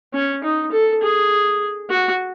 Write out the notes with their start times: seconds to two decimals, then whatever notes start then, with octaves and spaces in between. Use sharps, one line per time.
0.14 C#4
0.43 D#4
0.72 A4
1.02 G#4
1.90 F#4